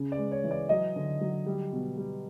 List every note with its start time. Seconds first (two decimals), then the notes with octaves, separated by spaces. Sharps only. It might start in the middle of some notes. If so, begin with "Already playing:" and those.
Already playing: C#3
0.12 D5
0.18 G#3
0.32 C#5
0.44 E3
0.51 D5
0.69 F#3 D#5
0.96 D3
1.21 F#3
1.46 G3
1.72 B2
1.97 G3